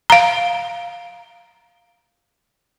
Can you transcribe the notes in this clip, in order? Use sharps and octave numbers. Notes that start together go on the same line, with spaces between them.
F5 A#5